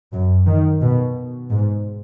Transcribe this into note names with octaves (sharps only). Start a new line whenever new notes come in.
F#2
D#3
B2
G#2